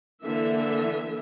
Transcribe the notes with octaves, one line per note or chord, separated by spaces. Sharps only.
D3 E3 A#3 E5